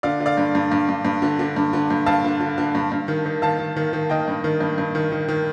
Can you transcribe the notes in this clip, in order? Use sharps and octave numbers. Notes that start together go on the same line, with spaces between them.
D3 D5 F5
D3
D5 F5
G2
G2
G2
G2
G2
D3
D3
G2
D3
G2
G2 F5 A5
D3
D3
D3
G2
G2
D#3
D#3
D#3 F5 A5
D#3
D#3
D#3
D#3 D#5 G5
G2
D#3
G2
G2
D#3
D#3
D#3